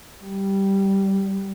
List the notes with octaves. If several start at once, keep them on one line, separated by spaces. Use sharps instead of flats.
G3